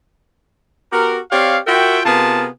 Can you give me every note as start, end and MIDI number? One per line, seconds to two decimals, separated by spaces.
0.92 1.19 59
0.92 1.19 66
0.92 1.19 67
0.92 1.19 70
1.31 1.59 60
1.31 1.59 67
1.31 1.59 73
1.31 1.59 74
1.31 1.59 77
1.67 2.00 65
1.67 2.00 66
1.67 2.00 70
1.67 2.00 76
1.67 2.00 79
2.05 2.47 48
2.05 2.47 59
2.05 2.47 65
2.05 2.47 68
2.05 2.47 70
2.05 2.47 81